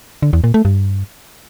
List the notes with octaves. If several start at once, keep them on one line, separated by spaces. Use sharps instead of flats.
D3
E2
A#2
A3
G2